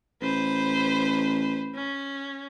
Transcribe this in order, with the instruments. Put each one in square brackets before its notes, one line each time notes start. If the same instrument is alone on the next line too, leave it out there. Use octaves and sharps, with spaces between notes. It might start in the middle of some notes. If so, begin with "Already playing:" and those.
[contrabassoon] A1 [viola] B4 C5
[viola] C#4